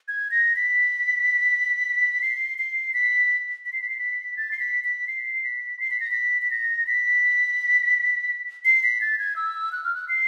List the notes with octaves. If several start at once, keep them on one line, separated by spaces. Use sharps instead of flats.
G#6
A#6
B6
C7
C7
B6
B6
C7
B6
C7
B6
A6
C7
B6
B6
C7
B6
C7
B6
A#6
B6
B6
A#6
B6
C7
B6
A6
G#6
E6
F#6
F6
F#6
C7